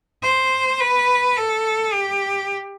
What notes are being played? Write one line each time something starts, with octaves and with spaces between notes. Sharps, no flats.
C5
B4
A4
G4